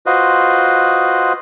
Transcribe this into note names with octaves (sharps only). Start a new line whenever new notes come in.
F4 F#4 B4 C5 D#5